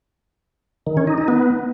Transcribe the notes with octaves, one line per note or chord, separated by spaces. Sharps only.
D#3
C#4
D#4
D#4
B3